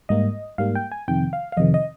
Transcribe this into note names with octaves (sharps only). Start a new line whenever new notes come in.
G#2 G3 A#3 D#5
G#2 G3 A#3 F5
G5
G#5
F2 C3 D#3 G5
F5
F5
F2 C3 D#3 D#5
D#5